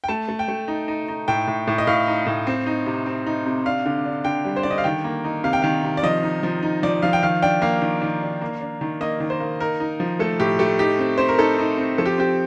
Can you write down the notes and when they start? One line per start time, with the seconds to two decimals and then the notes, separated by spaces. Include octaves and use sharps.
0.04 G5
0.08 A3 A5
0.29 A3
0.39 G5
0.48 A3
0.68 D#4
0.88 D#4
1.08 D#4
1.28 A2 G5
1.47 A2
1.67 A2
1.78 D#5
1.87 A2 F5
2.07 D#4
2.26 A2
2.47 C4
2.67 D#4
2.86 C3
3.06 C4
3.26 D#4
3.46 C3
3.66 D4 F5
3.86 D3
4.05 D4
4.25 D3 G5
4.45 G3
4.56 C5
4.63 D3 D5
4.71 D#5
4.78 F5
4.84 D#3 G5
5.04 A#3
5.24 D#4
5.44 C3 F5
5.53 G5
5.62 D#3 F5
5.84 C3
5.97 D5
6.03 F3 D#5
6.23 D#4
6.43 F3
6.62 D#4
6.83 F3 D5
7.02 F3 F5
7.13 G5
7.23 D#3 F5
7.42 D4 G5
7.62 A#3 F5
7.82 D#3
8.02 D#3
8.22 D4
8.42 A#3
8.61 D4
8.81 D#3
9.01 A#3 D#5
9.20 D#3
9.30 C5
9.40 A#3
9.60 D#4 A#4
9.80 D#4
10.00 F3
10.19 A3 A4
10.40 A2 G4
10.59 A3 G4
10.79 D#4 G4
10.99 C4
11.18 C4 C5
11.28 A#4
11.39 D#4 A4
11.59 D#4
11.78 C4
11.98 F3 A4
12.05 G4
12.18 C4 G4